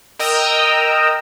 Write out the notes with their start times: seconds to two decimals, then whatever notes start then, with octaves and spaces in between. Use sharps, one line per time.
0.19 A#4 D#5 G5 A#5 D#6 E6